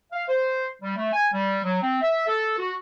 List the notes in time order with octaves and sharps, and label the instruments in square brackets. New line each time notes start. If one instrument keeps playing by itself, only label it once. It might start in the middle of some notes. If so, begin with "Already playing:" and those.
[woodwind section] F5
C5
G3
A3
G#5
G3
F#3
C4
E5
A4
F#4